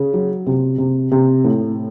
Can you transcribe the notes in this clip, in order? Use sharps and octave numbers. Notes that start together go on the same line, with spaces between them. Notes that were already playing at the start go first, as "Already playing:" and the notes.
Already playing: C#3
F#3
C3
C3
C3
A2